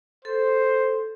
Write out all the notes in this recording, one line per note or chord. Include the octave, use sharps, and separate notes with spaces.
A4 C5